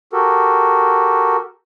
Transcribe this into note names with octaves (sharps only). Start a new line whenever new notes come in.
F#4 G4 A4 A#4